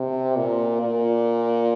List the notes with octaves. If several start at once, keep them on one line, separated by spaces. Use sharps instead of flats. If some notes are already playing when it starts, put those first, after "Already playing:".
Already playing: C3
A#2
A#2